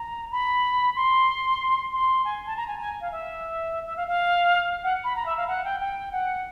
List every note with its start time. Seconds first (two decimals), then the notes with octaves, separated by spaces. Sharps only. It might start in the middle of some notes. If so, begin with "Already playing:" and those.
Already playing: A#5
0.32 B5
0.96 C6
1.93 C6
2.25 G#5
2.47 A5
2.57 A#5
2.68 G#5
2.79 G#5
3.01 F5
3.12 E5
3.86 E5
3.97 F5
4.08 F5
4.84 F#5
5.04 B5
5.16 A#5
5.26 E5
5.37 F5
5.48 F#5
5.64 G5
5.80 G5
6.12 F#5